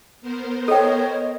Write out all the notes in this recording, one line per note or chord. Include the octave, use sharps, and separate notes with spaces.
B3 A#4 C5
A4 C#5 D#5 G5